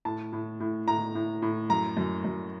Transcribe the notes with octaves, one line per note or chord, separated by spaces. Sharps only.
A2 A5
A2
A2
A2 A#5
A2
A2
F#2 A#5
F#2
F#2